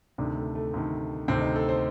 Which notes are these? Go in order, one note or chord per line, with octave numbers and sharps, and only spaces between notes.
D2 C3 D#3 D4
A3
A3
D2 C3 D#3
D2 C3 D#3 C4
D#4
A4
C5